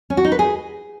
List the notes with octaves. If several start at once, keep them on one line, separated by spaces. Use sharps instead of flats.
C#4
F#4
D#4
B4
G#4